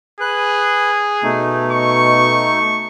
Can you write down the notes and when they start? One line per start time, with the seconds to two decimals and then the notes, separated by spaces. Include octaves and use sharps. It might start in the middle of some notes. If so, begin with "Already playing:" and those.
0.21 G#4 B4 F#6
1.23 B2 A3 D#4
1.72 C#6